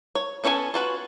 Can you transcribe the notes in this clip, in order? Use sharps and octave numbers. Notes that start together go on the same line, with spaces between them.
C#5
B3 C#4 A4 C#5 G#5
F4 F#4 B4